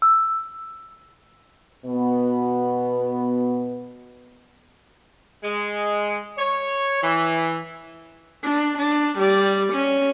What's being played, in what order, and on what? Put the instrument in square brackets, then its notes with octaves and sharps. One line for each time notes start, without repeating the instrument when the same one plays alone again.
[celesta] E6
[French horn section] B2 B3
[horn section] G#3
C#5
E3
[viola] D4
D4
G3 D5
C#4